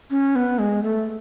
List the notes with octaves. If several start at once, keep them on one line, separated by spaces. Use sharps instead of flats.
C#4
B3
G#3
A3